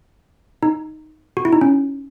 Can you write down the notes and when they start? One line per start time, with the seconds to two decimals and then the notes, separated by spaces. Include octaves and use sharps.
0.63 D#4
1.37 F#4
1.45 E4
1.53 D#4
1.61 C#4